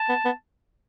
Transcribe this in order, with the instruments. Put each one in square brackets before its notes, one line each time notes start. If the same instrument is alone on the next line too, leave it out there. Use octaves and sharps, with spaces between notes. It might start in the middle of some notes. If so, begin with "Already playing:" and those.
Already playing: [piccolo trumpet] A5
[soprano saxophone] B3
B3